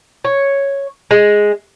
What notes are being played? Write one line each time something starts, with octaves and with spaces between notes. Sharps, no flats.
C#5
G#3